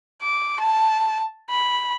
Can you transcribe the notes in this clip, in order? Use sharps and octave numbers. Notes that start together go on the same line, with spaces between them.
D6
A5
B5